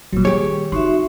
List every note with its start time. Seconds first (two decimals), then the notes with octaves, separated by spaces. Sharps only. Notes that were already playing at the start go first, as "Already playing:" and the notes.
0.13 A#2 D#3 F#3 G3
0.25 G4 G#4 C#5
0.72 C4 D#4 F#4 E5 C6 C#6